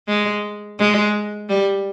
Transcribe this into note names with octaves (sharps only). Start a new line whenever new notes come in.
G#3
G#3
G3